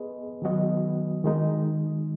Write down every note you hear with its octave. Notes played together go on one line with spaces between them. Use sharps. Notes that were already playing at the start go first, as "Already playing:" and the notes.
Already playing: B3 G#4 B4 D#5
D#3 F#3 B3 F#4 D#5
D#3 G#3 D#4